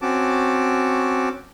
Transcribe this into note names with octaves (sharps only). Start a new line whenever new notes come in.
C4 C#4 F#4 A5 D6